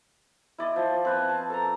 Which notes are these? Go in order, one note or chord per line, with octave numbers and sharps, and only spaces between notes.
E4 D5 D#5
F3
C4 B4 G#5
A5
A4 A#5